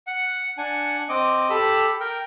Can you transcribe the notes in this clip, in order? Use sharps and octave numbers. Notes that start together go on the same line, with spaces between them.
F#5
D4 F#5 G#5
C4 D#5 D6
G4 A4 B5 E6
A#4 G5